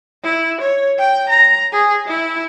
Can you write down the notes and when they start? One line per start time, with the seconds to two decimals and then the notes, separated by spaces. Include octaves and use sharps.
0.24 E4
0.61 C#5
0.98 G5
1.30 A#5
1.72 G#4
2.08 E4